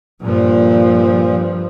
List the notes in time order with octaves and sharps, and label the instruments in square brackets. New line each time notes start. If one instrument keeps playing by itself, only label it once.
[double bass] G2 F3 [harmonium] A#2